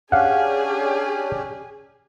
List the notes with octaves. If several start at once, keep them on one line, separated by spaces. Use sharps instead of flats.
C#4 D4 G4 G#4 F5 F#5